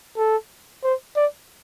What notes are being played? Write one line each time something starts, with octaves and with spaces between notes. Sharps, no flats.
A4
C5
D5